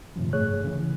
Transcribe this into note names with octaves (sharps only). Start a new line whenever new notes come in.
F#2 A2 C3 D#3 F3
G2 A3 G#4 C#5 F#6
C#3 E3